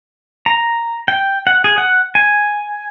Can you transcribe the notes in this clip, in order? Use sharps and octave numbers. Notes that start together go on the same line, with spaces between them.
A#5
G5
F#5
G#4
F#5
G#5